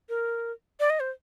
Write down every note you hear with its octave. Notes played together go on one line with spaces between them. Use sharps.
A#4
D5
D#5
C5